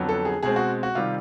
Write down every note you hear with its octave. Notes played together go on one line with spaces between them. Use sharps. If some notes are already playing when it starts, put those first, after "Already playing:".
Already playing: F2 D3 F#3 B3
A4
G#4
B2 G#3 C4 G#4
F#4
F#4
C3 D#3 G3 F4